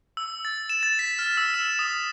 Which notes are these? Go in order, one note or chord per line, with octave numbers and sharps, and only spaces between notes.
E6
A6
E7
A6
B6
F6
E6
E7
D#6